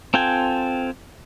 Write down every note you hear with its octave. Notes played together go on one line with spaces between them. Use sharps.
C4 F4 A4 G5 G#5